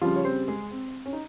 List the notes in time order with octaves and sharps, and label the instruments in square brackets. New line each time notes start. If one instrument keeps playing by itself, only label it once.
[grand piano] C#3 F3 G3 F4
C#5
C4 C5
G#3 G#4
C4
C#4
D#4